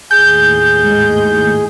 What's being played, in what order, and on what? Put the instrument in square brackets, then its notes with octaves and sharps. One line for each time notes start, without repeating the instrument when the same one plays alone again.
[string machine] D#2 A2 [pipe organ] G#4 [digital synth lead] G6
[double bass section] G#2 G#3